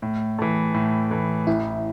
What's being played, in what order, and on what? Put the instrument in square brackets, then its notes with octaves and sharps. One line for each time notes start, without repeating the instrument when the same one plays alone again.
[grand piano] A2
E3 A3
A2
E3 A3
[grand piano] A1 [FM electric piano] E4